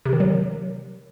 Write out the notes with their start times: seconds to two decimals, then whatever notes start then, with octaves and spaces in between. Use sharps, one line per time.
0.05 C3
0.13 D#3
0.20 F#3